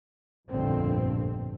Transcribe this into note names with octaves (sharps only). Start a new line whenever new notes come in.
F1 A#1 G2 B2 D3 C4